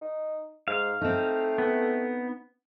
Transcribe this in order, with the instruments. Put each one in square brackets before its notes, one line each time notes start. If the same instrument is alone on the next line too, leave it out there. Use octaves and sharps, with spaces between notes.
[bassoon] D#4
[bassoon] G#2 [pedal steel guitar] F5
[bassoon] A3 [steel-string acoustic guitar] C4 D#4
[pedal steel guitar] B3